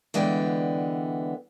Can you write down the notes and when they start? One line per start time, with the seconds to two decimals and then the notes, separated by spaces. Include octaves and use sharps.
0.14 D3 E3 G#3 B3 D5 G5